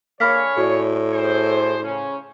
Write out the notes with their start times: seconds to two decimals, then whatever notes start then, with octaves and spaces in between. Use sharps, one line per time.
0.20 D3 A#3 G#4 C#5 B5 F6 B6
0.57 A2 F#4 D5
1.14 G#4 A4 C5
1.83 C#3 C#4